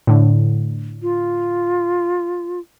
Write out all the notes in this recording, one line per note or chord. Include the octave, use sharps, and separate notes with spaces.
A2 D3
F4